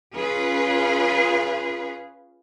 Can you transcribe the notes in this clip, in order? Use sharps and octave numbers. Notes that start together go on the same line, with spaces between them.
C#4 F4 G#4 B4